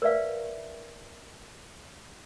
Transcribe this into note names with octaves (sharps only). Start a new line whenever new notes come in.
A#4 B4 D5 E5 F5